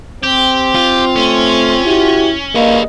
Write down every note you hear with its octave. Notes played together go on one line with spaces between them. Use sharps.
C4 G4
F4
A3 C#4
E4 F#4 G4
G3 A#3 D4 G#4 B4 D#5